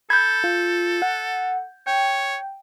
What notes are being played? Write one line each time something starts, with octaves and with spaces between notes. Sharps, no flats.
A4 B5 G6 G#6
F4
F#5
C#5 G5